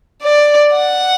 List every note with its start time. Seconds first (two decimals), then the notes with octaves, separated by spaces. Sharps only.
0.23 D5
0.73 F#5